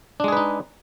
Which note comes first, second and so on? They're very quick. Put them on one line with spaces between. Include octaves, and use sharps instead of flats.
D4 G#3 G#4 B4 D#4